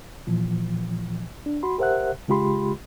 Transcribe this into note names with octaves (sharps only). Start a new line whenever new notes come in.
A#2 E3 F3
D4
F#4 B5 C6
G4 A#4 C5 E5 F#5 F#6
C#3 G#3 F4 G4 B5 C6